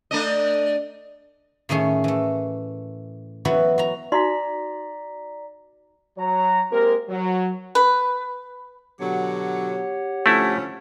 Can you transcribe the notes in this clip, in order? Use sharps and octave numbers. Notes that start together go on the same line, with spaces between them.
A3 D4 D#5
A2 D#3 A3 C#4 G#4
E3 A3
E3 F#3 B3 E4 F#4 B4
F#4 A#5
D#4 F#4 D5 A#5 C6 B6
F#3 C#5 A#5
G#3 A#3 C4 G4 A#4
F#3
B4
B2 D3 F#3 G4 C#5 F#5
D3 F3 A3 C#4 E4